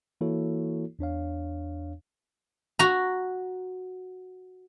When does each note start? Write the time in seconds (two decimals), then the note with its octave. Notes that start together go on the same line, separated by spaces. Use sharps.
0.21 E3 A#3 E4 F#4 A4 C#5
0.99 E2 D4 C#5 F5
2.79 F#4 A#5